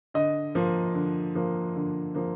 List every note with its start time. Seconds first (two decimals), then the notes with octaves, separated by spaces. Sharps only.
0.14 D3 D#5
0.55 F3 A#3
0.94 D3
1.35 F3 A#3
1.76 D3
2.15 F3 A#3